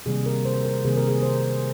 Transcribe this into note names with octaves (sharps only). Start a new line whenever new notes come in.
C3 D#3 G3 A#3 G#4
A#4
C5
A#4
C3 D#3 G3 A#3 G#4
A#4
G#4
C5